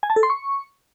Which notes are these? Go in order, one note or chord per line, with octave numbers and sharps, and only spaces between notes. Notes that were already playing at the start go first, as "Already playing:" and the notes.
G#5
A5
A4
C6
C#6